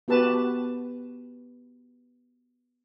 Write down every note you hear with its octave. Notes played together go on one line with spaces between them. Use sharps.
B3 F#4 G4 B4 A5